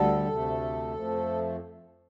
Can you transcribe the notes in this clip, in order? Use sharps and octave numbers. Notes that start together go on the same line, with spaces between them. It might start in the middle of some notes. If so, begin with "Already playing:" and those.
Already playing: D2 D3 G3 A4
D2 C3 A3
F2 F3 A3